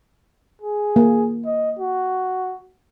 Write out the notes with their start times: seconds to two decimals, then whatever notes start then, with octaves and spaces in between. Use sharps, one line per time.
0.62 G#4
0.96 A#3
1.46 D#5
1.79 F#4